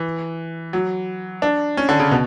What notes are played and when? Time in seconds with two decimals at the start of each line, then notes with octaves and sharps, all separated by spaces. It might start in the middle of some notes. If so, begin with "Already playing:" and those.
Already playing: E3
0.73 F#3
1.42 D4
1.77 C#4
1.89 D3
1.99 C#3
2.11 B2